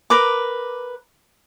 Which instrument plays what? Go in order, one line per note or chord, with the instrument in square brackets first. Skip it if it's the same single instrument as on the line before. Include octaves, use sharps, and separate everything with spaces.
[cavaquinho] A#4 B4 D6